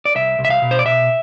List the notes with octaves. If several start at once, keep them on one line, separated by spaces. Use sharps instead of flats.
D5
C2 E5
C2
E5
F5
B2
C5
D5
B2 E5